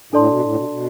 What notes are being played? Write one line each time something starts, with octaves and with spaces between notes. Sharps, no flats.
A2 D4 A4 D5 A5 C6
B2
A2
B2
B2